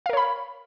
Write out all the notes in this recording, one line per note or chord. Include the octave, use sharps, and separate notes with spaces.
A#4 C#5 F5 B5